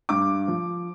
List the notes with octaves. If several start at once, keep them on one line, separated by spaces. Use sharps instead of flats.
G2 D6
F3